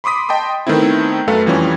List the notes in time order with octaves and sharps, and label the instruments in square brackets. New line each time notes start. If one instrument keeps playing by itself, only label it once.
[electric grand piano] B5 C6 D6 D#6 B6
D#5 G5 A5 C6 D#6
D#3 A3 B3 C4 E4
F#2 A3 A4 B4 F5
F2 E3 F3 G3 C#4